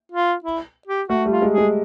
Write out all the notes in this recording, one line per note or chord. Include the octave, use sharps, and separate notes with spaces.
F4
E4
G4
A3 F#4
G3 F4
G#3
G#4
G#3